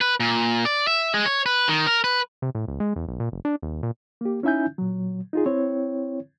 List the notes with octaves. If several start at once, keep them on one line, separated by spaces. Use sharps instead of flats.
B4
A#2
D5
E5
G#3
C#5
B4
D#3
A#4
B4
C3
A2
C#2
G#3
E2
B1
A#2
F#1
D4
D#2
A#2
A#3 G4
C#4 D#4 E4 E5 G#5 G6
A#2 F#3
D#4 F4 G#4
C4 E4 C#5